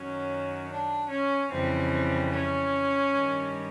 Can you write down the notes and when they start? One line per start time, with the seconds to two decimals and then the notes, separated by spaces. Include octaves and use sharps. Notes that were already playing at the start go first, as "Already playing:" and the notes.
Already playing: F#2 D#3 F#3 C#4
0.69 D4
1.09 C#4
1.51 F2 C#3 E3 G3 C4
2.31 C#4
3.12 G2 D#3 G3